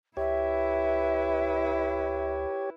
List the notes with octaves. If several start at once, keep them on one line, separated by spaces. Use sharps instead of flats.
C#2 E4 G4 B4 C#5 E5